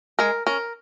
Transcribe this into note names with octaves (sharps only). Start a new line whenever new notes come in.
G#3 A#4
C#4 A#4